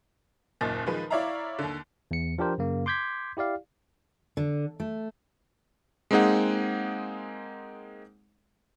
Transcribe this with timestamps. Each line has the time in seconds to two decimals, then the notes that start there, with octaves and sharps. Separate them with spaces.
0.61 F#1 D#2 A#2 D#5 A6
0.86 D#3 F3 G#3 B4
1.10 E4 C#5 D5 E5 F5 A#5
1.59 D#2 D3
2.11 E2 C#7
2.38 F3 D4 G4 A#4 C5
2.58 F#2 C#3 A#3
2.86 C6 D6 G6 G#6 B6
3.37 E4 G4 D5 F5
4.37 D3
4.80 A3
6.11 G#3 A#3 C4 D#4 G#4 F#5